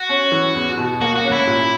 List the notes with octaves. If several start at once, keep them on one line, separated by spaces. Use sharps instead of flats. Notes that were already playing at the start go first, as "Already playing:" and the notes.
Already playing: F#4
C#4
E3
E2
B2
A#3 F#4
F#4
C#4
E4
A#2